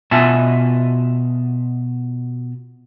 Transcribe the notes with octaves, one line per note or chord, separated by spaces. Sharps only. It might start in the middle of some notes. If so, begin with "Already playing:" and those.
B2 B3 F4 E5 G#5 A5